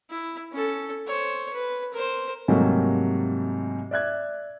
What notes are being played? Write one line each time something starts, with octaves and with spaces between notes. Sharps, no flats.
E4
C#4 A4
C5 C#5
B4
A#4 C5
G#2 C3 F#3 G3 A3 A#3
D5 E5 F#6 G#6